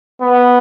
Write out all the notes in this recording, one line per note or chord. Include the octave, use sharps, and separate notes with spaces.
B3